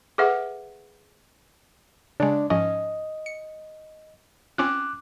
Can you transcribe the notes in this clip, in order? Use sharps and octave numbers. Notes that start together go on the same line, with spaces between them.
G#4 A4 B4 E5 F#5
C#3 G#3 D4 D5
G#2 F3 C#4 D#5
C#7
C4 C#4 F4 D6 F#6